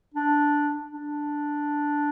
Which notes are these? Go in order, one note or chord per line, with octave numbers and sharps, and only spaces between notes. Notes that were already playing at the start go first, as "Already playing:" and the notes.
D4
D4